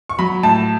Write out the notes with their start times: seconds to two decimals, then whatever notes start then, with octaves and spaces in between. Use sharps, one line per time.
0.09 C#6
0.19 F#3 B5
0.43 A2 A5